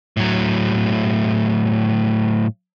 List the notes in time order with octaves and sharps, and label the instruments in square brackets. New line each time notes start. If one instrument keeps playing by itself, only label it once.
[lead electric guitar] A2 F#3